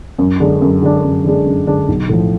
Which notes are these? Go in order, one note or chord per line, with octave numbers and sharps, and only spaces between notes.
F#2
D3 G#3 D4
F#2
D3 G#3 D4
F#2
D3 G#3 D4
F#2
D3 G#3 D4
B1
A2 F3